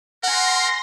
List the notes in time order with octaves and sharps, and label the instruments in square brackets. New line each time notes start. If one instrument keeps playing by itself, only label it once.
[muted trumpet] A#4 [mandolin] F#5 G#5 [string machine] C6 A#6